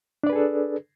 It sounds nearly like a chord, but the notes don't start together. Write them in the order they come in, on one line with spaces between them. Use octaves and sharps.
D4 D5 B4 G#4 A4